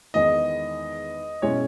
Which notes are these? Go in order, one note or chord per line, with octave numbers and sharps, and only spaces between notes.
E2 D#3 G#3 D#4 D#5
B2 G#3 C#4 E4 C#5